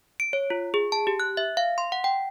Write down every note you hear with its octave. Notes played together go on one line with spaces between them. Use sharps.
D7
C#5
F4
G#4
A5
G4
F#6
E5
F5
C6
F#5
G5